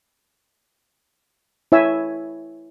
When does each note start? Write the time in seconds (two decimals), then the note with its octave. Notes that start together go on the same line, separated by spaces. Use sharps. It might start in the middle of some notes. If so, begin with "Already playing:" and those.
1.72 E4 C#5 E5 G#5 E6